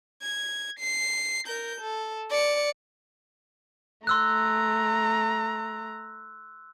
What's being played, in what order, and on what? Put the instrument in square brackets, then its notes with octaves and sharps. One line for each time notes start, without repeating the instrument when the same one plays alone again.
[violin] G#6
C7
A#4 G6
A4
D5 C#7
[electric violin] A3 A#5 [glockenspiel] C6 E6 F#6